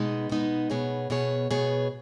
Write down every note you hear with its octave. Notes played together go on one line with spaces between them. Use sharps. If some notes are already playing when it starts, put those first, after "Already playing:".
Already playing: B2 G#3 B3 D#4
B2 G#3 B3 D#4
B2 B3 G#4 C#5
B2 B3 G#4 C#5
B2 B3 G#4 C#5